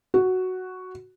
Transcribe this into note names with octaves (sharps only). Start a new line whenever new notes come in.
F#4